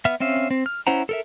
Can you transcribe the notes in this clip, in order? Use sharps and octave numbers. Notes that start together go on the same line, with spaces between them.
B3 E5 F6
C4 C#4 E5 F5
C4
F6
C#4 E4 C5 F#5 A#5
A4 A#4 E5